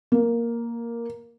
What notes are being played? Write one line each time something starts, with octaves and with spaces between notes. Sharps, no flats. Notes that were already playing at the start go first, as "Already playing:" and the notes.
A#3